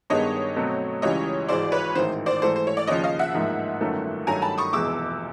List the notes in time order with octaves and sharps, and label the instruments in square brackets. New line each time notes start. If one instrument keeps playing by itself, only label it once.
[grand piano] G2 D#3 G#3 B3 [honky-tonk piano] C#5 D#5
[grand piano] B2 F#3 A3 C4
[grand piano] C#2 C#3 E3 G3 [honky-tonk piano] C#5 D#5
[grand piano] G#1 G#2 E3 G#3 [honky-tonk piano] C5 D5
[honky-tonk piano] B4 C#5
[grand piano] A1 G#2 D#3 [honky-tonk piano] C5
[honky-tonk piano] C5 D5
[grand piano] G#2 E3 A3 [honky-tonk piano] C5
[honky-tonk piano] C5
C#5
D5
[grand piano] D#2 C#3 F3 [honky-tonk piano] C#5 D#5
[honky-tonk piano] D#5 F5
E5 F#5
[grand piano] A1 G#2 F3 A#3 D#4
G1 F#2 D#3 F#3 A3
[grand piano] G2 D#3 F#3 A3 [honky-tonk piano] G#5 A#5
[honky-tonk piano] A5 B5
C#6 D#6
[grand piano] F1 E2 B2 G#3 [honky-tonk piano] D6 E6